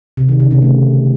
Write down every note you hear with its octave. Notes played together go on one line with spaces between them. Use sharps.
C3
D#3
C#3
C3
A3